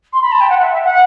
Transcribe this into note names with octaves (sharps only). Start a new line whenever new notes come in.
C6
B5
A5
G5
F#5
E5
E5
F#5